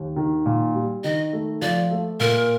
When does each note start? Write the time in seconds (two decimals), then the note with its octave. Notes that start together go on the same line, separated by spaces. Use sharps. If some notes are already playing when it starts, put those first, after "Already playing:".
Already playing: D#2
0.16 D#3
0.46 A#2
0.74 G3
1.04 D#3 D#5
1.33 A3
1.62 F3 D5
1.91 A3
2.20 A#2 A#4